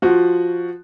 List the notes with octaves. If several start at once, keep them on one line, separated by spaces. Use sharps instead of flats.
F3 F#4